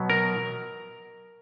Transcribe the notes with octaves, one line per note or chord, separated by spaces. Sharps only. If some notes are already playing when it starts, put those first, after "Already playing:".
Already playing: B2 F#3 B3
A#4